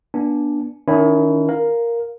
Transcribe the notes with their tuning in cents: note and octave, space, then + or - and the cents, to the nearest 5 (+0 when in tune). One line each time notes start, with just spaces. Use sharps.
B3 -35 D4 +0 G#5 +15
D#3 +0 C#4 +35 E4 +0
A#4 +0 F5 +0